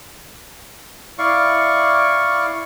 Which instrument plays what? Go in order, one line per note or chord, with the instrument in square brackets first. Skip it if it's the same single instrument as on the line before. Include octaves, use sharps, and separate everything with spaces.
[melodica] E4 D5 F5 C#6